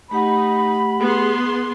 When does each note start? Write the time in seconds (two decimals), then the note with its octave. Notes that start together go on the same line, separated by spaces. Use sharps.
0.11 A3 D#4 G4 F#5 B5
1.00 B3 G#4 C6